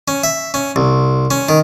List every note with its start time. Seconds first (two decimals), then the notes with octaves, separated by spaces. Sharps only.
0.08 C#4
0.24 E5
0.54 C#4
0.76 C2
1.31 C#4
1.49 D#3